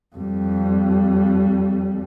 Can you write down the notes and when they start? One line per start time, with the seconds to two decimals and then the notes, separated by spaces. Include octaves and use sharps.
0.16 F2 G3